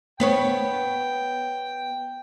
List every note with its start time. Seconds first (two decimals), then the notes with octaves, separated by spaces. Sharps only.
0.20 B3 B4 C#5 G5